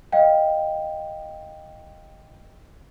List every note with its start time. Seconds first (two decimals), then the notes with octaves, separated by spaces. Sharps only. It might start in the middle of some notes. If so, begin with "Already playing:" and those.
0.12 D#5 F5 G5